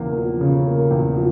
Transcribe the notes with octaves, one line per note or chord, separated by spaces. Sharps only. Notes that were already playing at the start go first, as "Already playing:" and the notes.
Already playing: E2 C#3 A#3
F3
C#3
A#3
E2
F3